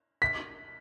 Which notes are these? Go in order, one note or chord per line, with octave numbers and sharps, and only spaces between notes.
B6